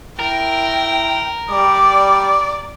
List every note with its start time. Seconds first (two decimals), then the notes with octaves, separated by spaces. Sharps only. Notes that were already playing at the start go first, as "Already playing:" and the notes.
0.19 E4 A#4 G5
1.51 G3 D5 D6